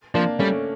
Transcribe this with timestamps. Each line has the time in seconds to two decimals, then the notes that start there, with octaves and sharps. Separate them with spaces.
0.14 F3 A#3 D4
0.39 G3 A3 C#4